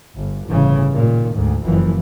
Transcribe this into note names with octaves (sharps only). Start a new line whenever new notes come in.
G1
G1 A2 C#3 E3
A#2 D#3
D2 G#2
F#1 E3 F3